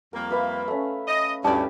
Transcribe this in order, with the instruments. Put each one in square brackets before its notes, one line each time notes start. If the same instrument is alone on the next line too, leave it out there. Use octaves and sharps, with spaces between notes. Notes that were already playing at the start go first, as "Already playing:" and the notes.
[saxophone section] F2 G3 A#3 [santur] A#4
[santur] B4 E5 F5
A3 C#4
[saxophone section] D#5
[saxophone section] D2 G2 [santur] C#4 E4 G4 [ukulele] D5 A5